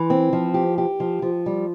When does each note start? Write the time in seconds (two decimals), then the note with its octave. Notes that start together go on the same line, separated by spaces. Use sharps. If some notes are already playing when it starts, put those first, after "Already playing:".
Already playing: E3
0.10 C4
0.33 F3
0.54 G4
0.78 G4
1.00 F3
1.22 F3
1.46 G3